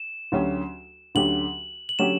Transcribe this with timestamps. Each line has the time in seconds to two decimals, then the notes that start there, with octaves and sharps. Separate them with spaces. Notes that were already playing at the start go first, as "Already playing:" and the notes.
Already playing: E7
0.32 D2 D3 F#3 C#4 G4
1.15 D2 D3 F#3 C#4 G4 F#7
1.89 F#7
1.99 D3 F#3 C#4 G4 E7